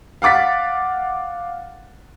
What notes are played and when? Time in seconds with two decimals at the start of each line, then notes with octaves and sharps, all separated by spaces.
0.22 F5 F#5 D6 A6 B6